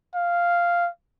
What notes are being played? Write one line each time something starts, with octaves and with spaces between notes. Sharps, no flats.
F5